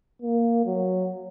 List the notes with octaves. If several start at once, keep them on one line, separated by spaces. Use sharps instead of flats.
A#3
F#3